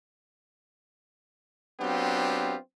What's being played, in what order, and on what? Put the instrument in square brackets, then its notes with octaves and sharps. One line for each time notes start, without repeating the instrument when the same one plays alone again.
[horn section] F#3 B3 C4 D4 F4 G4